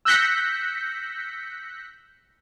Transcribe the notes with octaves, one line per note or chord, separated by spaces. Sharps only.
E6 F#6 G6 A#6 B6 C#7